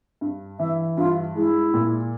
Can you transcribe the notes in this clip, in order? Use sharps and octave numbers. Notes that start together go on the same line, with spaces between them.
G2
E3 E5
G2 F4
G#3 E4
A#2